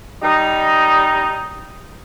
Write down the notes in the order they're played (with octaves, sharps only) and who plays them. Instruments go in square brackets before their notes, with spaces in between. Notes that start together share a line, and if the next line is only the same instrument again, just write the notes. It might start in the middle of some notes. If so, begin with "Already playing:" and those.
[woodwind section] G3 D#4